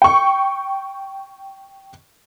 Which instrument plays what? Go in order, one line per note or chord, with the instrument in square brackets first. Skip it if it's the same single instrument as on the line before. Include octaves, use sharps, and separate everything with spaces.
[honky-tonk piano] G5 C#6